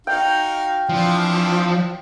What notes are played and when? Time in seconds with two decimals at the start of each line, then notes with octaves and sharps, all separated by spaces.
0.07 D#4 F#4 F5 G5
0.89 E3 F3 C4 D4